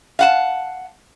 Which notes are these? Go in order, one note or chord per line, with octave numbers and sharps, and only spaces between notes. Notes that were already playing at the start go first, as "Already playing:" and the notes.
F5 F#5 A5